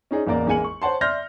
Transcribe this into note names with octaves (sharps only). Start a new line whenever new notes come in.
C#4 D#4 G#4 D5
A1 E2 A#3 A#4 D5
A1 G#3 A#3 G#5 C#7 F#7
C#6
C5 C#5 F#5 A5 C6
D5 E5 C6 F6 G6 A#6